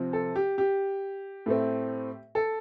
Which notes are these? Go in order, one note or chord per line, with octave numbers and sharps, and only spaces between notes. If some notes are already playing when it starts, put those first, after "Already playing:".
Already playing: C3 F3 C4
A4
G4
G4
A2 A3 C4
A4